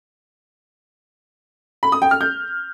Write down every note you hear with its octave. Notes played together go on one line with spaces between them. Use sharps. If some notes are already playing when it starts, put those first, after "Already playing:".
B5
D#6
G5
F6
G6